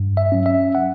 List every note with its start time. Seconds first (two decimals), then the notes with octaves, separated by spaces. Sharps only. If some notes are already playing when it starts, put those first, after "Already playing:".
Already playing: G2
0.17 E5
0.32 F#3 C#4
0.46 E5
0.75 F#5